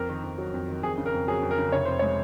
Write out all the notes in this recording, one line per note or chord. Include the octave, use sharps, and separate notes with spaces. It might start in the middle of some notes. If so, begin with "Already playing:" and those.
Already playing: F2 A#4
D#3
F2
F#3
F2
D#3
F2 G#4
C#3
A#4
F2
F#3 G#4
F2
A#4
C#3
F1 C#5
F2 C5
G#3 C#5